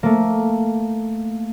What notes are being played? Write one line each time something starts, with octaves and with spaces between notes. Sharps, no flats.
A3 A#3